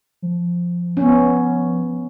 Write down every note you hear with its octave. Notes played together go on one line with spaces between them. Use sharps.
F3
B3 C#4